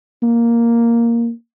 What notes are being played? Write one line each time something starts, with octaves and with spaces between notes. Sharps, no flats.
A#3